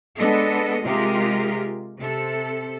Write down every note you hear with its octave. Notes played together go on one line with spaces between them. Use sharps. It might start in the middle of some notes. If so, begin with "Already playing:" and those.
G#3 B3 D4 A4 D#5
C3 G#3 F4 G4 G#4 A#4
C3 A4